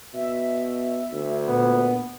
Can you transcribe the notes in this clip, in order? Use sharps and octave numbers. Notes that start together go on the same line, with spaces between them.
B2 E5
D2
A#2 B3